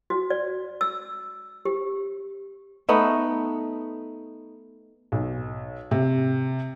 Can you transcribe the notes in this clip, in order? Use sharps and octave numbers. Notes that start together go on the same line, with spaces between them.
F#4
D5
E6
G4
A3 B3 D#4
B1
C3